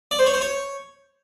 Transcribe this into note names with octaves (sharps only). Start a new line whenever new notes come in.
D5
C5
C#5
C5
C#5